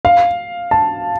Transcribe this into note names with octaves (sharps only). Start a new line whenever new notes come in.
F5
A5